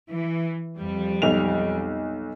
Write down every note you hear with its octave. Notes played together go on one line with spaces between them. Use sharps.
E3
F2 G3
B1 F7